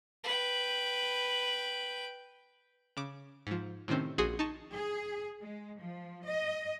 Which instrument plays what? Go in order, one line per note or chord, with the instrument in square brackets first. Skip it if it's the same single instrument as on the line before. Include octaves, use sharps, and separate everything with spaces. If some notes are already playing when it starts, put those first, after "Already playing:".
[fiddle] B4 G5
[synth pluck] C#3 D6
G#2 F3
A2 C3 D#3 C4 C#4
A#1 F#4 G#4 C6 D#6
D#4 A5 C#6
[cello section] G#4
G#3
F3
D#5